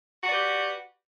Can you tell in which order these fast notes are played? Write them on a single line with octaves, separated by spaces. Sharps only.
F#4 D5 B4 G4